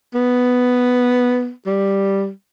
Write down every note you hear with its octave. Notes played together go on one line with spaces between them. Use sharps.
B3
G3